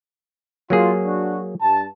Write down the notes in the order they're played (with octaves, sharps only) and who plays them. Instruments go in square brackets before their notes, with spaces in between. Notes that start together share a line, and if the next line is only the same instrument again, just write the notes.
[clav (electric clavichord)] F#3 A#3 G#4 [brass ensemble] F4
[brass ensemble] D4 F#4
G2 A5